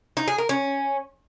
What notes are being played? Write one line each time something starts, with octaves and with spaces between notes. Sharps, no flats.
D#4
G#4
A#4
C#4